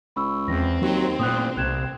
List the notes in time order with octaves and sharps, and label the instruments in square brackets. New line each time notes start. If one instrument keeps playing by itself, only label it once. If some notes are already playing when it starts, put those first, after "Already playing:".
[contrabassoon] C#2 [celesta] B5 C#6 E6
[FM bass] E2 [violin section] C4 [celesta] A#6
[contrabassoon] D#2 [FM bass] F#3
[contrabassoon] A1 [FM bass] A#2 [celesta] D#6 F#6
[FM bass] C2 [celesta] F#6 G#6 E7